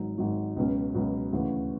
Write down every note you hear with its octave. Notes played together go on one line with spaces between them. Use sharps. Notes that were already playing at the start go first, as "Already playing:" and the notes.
Already playing: G#1 G#2 F#3
G#1 G#2 F#3
C#2 B2 F#3 C#4
C#2 B2 F#3 C#4
D2 C#3 E3